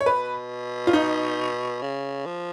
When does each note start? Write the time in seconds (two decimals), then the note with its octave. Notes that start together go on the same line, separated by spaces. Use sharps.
0.01 C#5
0.06 B2 B4
0.87 F4
0.93 D#4
1.82 C#3
2.26 F3